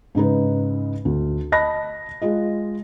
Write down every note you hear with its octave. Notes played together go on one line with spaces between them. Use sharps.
G#2 C#3 D#4 B4
D2
D#5 A5 B5 F#6 A#6
G#3 F4 D#5